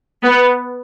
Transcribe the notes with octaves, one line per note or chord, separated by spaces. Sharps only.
B3